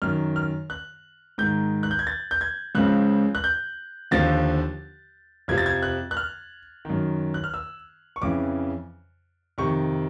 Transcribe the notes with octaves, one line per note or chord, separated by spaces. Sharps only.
F#2 D#3 F6
F6
F#6
G#2 D#3 G6
F#6
G6
G#6
A6
G6
G#6
C#2 C#3 F3 F#6
F#6
G6
D#2 D3 F3 A6
F2 C3 F3 G#6
A6
G#6
F#6
F#6
F6
F#2 D#3
F#6
F6
E6
C#6
F2 C#3 E3 D6
F2 C3 D#3 C#6